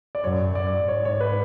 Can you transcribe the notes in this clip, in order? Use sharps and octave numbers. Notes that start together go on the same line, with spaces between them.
D5
F#2 C#5
F#2 D5
G#2 C#5
C#5
B4